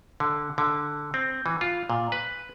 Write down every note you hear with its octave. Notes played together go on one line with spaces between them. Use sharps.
D3
D3
C4
E3
F4
A#2
B4